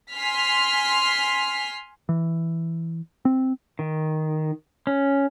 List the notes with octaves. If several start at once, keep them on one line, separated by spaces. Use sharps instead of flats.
G#5 C6 F6 B6
E3
C4
D#3
C#4